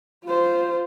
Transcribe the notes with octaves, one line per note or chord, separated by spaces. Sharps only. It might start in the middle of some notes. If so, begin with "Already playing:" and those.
F4 C5